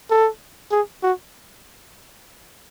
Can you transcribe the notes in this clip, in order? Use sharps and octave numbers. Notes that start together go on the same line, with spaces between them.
A4
G#4
F#4